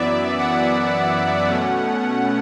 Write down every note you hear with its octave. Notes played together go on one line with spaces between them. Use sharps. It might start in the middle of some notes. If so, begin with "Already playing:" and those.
Already playing: F#2 E3 B3 D5 E5
F#5
B2 A3 C#4